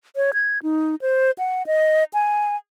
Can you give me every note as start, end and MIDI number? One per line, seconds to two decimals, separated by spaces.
0.16 0.31 73
0.34 0.59 92
0.63 0.95 63
1.02 1.31 72
1.38 1.63 78
1.67 2.04 75
2.14 2.56 80